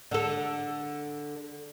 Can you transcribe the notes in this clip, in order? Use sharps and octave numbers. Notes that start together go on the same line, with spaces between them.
D3 A4